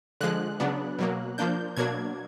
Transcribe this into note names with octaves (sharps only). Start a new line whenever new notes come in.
D3 F3 G#3 F#6
C#3 F#3 B3 D4
B2 F#3 A#3
F3 A#3 D4 G6
B2 F#3 A#3 D4 G#6